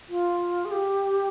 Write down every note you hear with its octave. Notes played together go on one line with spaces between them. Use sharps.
F4
G#4
G4